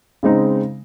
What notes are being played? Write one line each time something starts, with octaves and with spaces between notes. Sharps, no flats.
C#3 G#3 C4 D#4